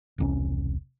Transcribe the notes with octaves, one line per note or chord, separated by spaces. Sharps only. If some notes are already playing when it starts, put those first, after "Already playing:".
E1 C2 C#4